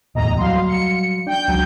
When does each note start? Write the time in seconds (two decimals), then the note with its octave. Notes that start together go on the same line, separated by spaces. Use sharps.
0.15 D1 E2 A2 D#5 A#5
0.37 F#3 G3 F5 C6
0.69 C#7
1.27 D4 G5 G6
1.48 C#2 F#3